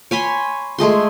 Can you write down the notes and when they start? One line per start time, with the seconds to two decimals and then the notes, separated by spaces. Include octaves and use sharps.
0.11 C#5 G#5 B5 C6
0.78 G#3 A3 G#4 C6